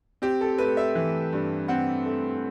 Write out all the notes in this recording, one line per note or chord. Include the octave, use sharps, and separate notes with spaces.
C4 G4
A4
A3 B4
E5
E3
G2
C4 F#5
A3